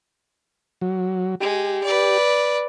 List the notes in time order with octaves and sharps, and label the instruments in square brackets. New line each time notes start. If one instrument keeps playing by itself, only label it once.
[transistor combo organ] F#3
[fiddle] G#3 [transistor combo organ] G4
[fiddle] B4 D5